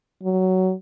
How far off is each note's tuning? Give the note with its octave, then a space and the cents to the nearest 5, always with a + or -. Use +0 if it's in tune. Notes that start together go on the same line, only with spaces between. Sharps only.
F#3 +15